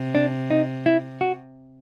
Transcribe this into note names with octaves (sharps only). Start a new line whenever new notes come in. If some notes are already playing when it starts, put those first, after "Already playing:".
Already playing: C3
D4
D#4
E4
F#4